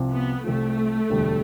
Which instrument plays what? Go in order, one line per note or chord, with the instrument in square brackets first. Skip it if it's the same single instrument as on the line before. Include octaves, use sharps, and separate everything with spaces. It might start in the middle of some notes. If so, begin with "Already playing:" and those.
Already playing: [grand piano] C2 C3 F3
[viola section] B3
[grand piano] C2 C3 F3 [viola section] A3
[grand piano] E1 D2 D3 G3